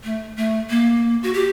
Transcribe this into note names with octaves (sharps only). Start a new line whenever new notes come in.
A3
A3
A#3
F#4
G4